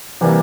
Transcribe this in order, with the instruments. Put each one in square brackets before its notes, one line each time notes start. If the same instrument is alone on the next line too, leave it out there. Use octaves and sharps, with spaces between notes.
[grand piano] C3 E3 G3 A#3